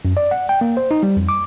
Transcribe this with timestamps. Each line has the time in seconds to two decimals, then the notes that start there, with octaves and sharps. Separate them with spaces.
0.05 F#2
0.17 D5
0.31 F#5
0.49 G5
0.61 A#3
0.77 C5
0.91 D#4
1.03 G3
1.17 F2
1.29 D6